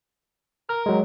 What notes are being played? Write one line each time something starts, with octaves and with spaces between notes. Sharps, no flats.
A#4 F6
F#3 G#3